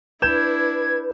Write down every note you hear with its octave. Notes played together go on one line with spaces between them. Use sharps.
D4 E4 B4 G6 G#6 E7